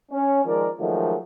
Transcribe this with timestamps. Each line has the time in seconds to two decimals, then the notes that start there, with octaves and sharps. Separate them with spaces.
0.11 C#4
0.45 D#3 F3 G#3 A#4 D5
0.79 D#3 F3 F#3 G#3 A3